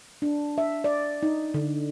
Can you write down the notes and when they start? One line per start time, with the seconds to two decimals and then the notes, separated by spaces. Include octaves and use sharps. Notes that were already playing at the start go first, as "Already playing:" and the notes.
0.22 D4
0.58 E5
0.84 D5
1.23 D#4
1.54 D3